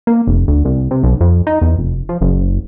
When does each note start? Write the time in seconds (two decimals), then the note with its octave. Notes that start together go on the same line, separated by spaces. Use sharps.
0.07 A#3
0.27 F1
0.48 D2
0.65 C2
0.91 C3
1.03 B1
1.21 F2
1.47 D#4
1.62 E2
1.78 F1
2.09 F3
2.21 F#1